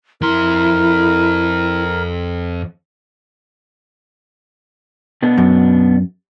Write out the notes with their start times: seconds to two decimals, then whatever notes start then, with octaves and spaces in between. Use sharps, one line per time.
0.21 F2 E4 A#4 C6
5.22 B2 B3 D4
5.38 F#2